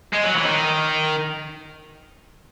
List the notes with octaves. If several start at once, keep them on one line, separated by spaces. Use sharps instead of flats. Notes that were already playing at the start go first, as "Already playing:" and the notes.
G#3
F#3
E3
D#3